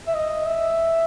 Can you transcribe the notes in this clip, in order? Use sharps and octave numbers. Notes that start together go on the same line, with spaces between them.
E5
D#5
E5